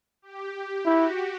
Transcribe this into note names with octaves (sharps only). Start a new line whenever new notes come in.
G4
E4 F#4